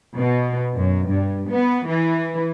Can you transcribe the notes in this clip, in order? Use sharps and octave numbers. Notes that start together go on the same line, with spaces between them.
B2
F#2
G2
B3
E3